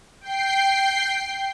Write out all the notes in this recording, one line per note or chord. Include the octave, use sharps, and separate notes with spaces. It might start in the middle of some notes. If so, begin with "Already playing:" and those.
G5 C7